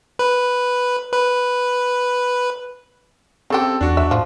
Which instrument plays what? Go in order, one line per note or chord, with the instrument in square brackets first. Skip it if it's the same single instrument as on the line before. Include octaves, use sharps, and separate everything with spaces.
[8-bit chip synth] B4
B4
[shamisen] C#3 G4 [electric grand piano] C4 A4
[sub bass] E2 [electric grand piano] D4 F#4
[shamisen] E5
[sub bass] A2 [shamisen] F3